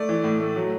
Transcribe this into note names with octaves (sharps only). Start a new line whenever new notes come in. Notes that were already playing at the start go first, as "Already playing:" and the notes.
Already playing: A3 D5
E3
A2
A3
F#3